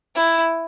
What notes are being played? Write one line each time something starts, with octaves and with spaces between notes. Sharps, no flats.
E4